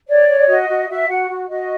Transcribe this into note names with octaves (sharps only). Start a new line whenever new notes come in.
C#5 D5
C#5
F#4 D#5
F#4
F#4 E5
F#4 F#5
F#4
F#4 D#5